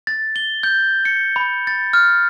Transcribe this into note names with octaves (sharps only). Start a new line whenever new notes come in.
A6
G7
G6
C#7
B5
A6
F6